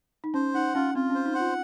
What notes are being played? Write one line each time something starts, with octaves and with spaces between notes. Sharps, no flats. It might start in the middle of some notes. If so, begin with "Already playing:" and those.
D#4
C#4 C5
D#4 F#5
C#4 F4
C4 F4
C#4 C5
D#4
F#5
F4